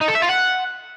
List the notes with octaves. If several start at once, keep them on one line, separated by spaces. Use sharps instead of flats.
D#4
A4
E5
F4
F#5